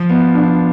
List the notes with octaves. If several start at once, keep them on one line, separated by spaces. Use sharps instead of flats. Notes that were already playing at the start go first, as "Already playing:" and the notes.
Already playing: F3 F4
B3
D4